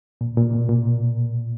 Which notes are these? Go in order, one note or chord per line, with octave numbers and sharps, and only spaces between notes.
A#2
A#2
B2
A#2